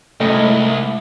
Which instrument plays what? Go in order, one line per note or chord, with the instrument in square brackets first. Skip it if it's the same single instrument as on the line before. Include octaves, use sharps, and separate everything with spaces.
[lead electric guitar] C2 [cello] G#2 E4 [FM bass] A3 [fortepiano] D#5